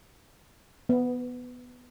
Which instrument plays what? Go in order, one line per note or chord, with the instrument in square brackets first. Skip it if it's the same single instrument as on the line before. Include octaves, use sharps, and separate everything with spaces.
[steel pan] B3